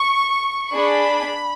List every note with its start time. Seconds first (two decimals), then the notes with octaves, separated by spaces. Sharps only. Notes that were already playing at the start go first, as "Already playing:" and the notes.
Already playing: C#6
0.73 D4 G#4 B5